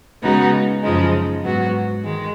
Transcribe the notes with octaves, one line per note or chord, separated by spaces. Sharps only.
C#3 G#3 B3 D#4 F#4
F#2 C#3 F3 G#3 D#4
G#2 F#3 B3 F#4
D#3 G#3